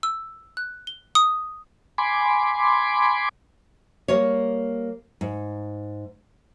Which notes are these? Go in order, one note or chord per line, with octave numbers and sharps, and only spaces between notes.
E6
F#6
G7
D#6
G#5 B5 C6 D6
G3 A#3 A#4 C#5
G#2